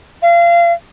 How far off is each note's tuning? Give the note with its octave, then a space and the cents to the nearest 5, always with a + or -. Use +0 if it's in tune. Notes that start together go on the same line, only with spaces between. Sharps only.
F5 -30